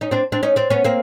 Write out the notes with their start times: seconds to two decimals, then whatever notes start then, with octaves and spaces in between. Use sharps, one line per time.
0.01 C#4 D#4
0.11 C4 D4
0.32 C4 D4
0.43 C#4 D#4
0.56 C4 D4
0.70 B3 C#4
0.84 A#3 C4